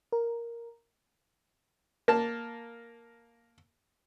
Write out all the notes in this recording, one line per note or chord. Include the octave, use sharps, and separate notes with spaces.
A#4
A#3 A5